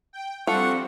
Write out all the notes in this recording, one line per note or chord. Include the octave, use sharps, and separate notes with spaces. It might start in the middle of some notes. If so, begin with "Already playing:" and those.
G5
F3 G3 C4 D4 F4 A4 F#5 C#6